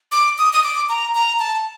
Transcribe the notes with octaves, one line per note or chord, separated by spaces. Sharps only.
D6
D#6
D#6
D6
A#5
A#5
A5